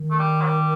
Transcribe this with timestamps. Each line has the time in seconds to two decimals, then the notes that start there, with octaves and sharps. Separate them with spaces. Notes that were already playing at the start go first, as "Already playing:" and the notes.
Already playing: D#3
0.11 A3
0.19 G3
0.41 F#3
0.45 G3